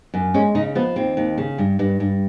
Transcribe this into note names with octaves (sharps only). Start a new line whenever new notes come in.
F#2
G#3 C#4
C#3 D#4
F3 B3
D#2 C4
D#2
C#3
G2
G2
G2